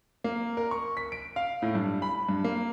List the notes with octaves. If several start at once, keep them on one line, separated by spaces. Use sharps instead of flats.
A#3
A#4
C#6
B6
D7
F5
A2
G2
B5
G2
A#3